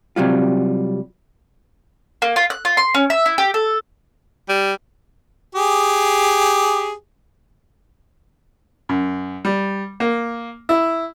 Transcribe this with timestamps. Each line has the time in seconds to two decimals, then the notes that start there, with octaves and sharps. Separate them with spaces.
0.16 C3 F#3 G3 F4
2.22 A#3
2.36 F4
2.50 F#6
2.65 F4
2.77 C6
2.94 C#4
3.10 E5
3.26 E4
3.38 G4
3.54 A4
4.49 G3
5.55 G4 G#4
8.89 F#2
9.45 G3
10.00 A#3
10.69 E4